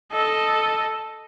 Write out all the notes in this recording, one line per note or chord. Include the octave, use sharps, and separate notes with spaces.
A4 D#5